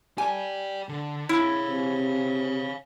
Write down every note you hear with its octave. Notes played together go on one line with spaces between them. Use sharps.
G4 D5 G#5
D3
E4 C#5 F5
C3